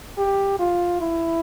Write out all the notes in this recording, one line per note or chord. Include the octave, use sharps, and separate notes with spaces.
G4
F4
E4